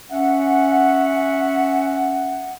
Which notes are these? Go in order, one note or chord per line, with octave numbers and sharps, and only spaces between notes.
C#4 E5 F#5